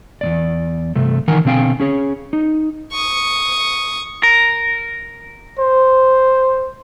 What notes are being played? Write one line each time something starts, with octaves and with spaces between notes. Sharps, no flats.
E2 G#2 D5
G2 C3 A3
D#3 E3 D#4 A#4 F#5 G#5
B2 D3 C4 F5 G5 G#5
C#4 G#4 C#5
D#4
C#6 D#6
A#4
C5